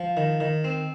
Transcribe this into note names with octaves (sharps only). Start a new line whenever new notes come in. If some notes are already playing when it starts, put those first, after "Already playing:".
Already playing: F3
D#3
D#3
C4